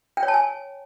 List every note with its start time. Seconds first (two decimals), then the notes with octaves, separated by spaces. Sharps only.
0.17 G5
0.23 C#5
0.28 A5
0.34 G#5